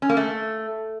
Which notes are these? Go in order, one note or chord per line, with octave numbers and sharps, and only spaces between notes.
C#4
A#3
A3